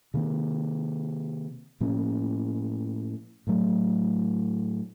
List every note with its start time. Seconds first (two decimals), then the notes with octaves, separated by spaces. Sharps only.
0.14 C3 D#3 A#3
1.81 A2 F3 A#3 C#4
3.47 A2 F#3 A3